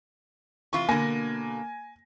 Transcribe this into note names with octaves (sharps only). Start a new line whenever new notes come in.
C3 E3 F4 C#6
B2 D3 A#3 G#5 A#6